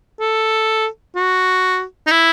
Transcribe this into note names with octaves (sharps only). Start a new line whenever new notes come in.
A4
F#4
D#4
E4